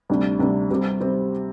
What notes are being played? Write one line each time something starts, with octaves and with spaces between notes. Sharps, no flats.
D2 C3 G3 D4
D2 C3 G3 D4
C3 G3 C4 G4
C3 G3 C4 G4